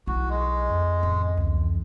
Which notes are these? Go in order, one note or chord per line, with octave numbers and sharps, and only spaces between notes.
B1 E4 F#4
G#3
F2
A1 D#3
C#2 E3